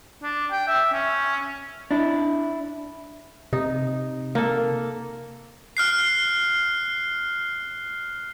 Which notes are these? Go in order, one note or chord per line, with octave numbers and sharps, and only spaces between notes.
D4
G5
E5
C#4
D4 E4
C3 D#4
A#3 A4
F6 F#6 C7